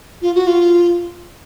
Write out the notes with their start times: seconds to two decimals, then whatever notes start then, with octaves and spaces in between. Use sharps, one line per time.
0.22 F4
0.35 F#4
0.47 F4